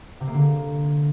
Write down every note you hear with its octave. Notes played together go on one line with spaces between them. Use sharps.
C3
A#3
D3